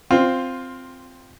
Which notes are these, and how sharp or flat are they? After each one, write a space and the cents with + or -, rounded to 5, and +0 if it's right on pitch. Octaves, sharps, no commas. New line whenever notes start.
C4 +0 F4 +10